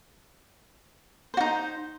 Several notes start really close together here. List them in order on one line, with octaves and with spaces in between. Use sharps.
C5 F#4 D#4